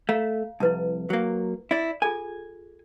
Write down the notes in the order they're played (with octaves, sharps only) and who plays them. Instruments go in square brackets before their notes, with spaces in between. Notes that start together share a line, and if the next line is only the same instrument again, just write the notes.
[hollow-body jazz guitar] A3 [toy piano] F5 A#5
[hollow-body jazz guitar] C2 F2 [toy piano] E4 B4 A5
[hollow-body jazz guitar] F#3 A#3
E4 D5
[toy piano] F4 G#4 A4 [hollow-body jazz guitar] G#5